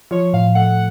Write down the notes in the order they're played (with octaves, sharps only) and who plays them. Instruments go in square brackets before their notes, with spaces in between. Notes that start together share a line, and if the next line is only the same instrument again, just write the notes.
[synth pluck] F3 [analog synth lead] C#5
[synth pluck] A2 [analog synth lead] F5
[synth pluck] A3 [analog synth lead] F#5